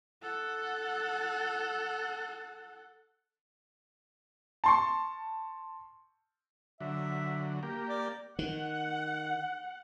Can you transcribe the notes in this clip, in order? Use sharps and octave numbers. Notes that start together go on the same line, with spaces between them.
A4 F#5
A5 C6 C#6
D3 F#3 E5
A#3 G4
D5
D#3 F#5